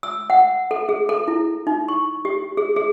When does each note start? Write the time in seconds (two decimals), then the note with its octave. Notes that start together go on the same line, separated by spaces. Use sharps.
0.03 E6
0.30 F#5
0.71 A4
0.89 G#4
1.09 A4
1.28 E4
1.67 D#4
1.88 C#6
2.25 G4
2.57 G#4
2.76 G#4